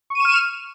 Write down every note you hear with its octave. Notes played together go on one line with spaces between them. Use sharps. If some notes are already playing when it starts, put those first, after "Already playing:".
C#6 F6 D#7 E7